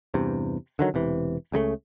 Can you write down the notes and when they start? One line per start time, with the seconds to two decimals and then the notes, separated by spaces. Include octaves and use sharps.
0.14 E2 G2 C3
0.79 D3 D#3 F#3
0.94 E1 C3 E3
1.52 C#2 C#3 G3 A3